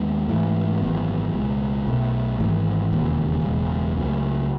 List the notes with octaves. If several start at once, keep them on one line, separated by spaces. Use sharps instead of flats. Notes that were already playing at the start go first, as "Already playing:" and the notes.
Already playing: D#2 D#3 G#3 B3
G#2 E3 A3
G#1 F#2 E3 B3
C#2 B2 G#3
B1 B2 A3
G#1 G#2 E3
E1 D#2 C#3
F#1 E2 B2 G#3
C#2 C#3 F#3 A3